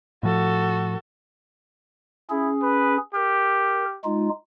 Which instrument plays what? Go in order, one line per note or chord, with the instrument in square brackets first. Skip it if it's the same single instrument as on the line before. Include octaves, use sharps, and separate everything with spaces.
[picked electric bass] A2 F3 [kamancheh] F#4 A4
[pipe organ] C#4 G#4 [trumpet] E4
[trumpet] B4
[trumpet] G4 [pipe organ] A#4
[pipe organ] G#3 D#4 F4